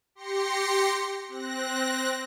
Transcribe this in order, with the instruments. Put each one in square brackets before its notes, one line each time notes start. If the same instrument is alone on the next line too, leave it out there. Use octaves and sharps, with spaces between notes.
[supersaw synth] G4 C6 A#6 C#7
C4 F#6 A#6